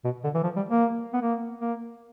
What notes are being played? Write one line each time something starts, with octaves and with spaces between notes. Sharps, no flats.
B2
D3
E3
F3
G3
A#3
B3
A#3
A#3